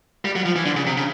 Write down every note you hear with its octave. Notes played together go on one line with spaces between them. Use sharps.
G3
F#3
F3
E3
D3
C#3
C3
C#3